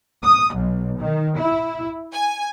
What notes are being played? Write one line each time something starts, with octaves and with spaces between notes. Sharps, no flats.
D#6
B1
D#3
E4
G#5